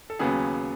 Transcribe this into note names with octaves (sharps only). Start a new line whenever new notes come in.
A4
D#2 C#3 F#3 B3 G#4